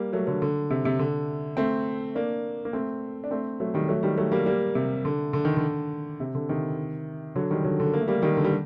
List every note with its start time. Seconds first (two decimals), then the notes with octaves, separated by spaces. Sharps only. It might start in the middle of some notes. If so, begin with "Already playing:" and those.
Already playing: G3 A#3
0.13 F#3 A3
0.27 D3 F#3
0.42 D3
0.70 C3
0.85 C3
0.99 D3
1.57 A3 C4
2.15 A#3 D4
2.65 A#3
2.73 A3 C4
3.24 D4
3.31 A3 C4
3.60 F#3 A3
3.74 D#3 G3
3.88 F#3 A3
4.03 D#3 G3
4.17 F#3 A3
4.32 G3 A#3
4.46 G3 A#3
4.75 C3
5.05 D3
5.33 D3
5.45 D#3
5.57 D3
6.20 C3
6.35 D3
6.49 C3 D#3
7.35 D3 F#3
7.51 D#3 G3
7.64 D3 F#3
7.80 D3
7.93 A#3
8.01 A3
8.08 G3 A#3
8.22 D#3 G3
8.37 D3
8.45 G3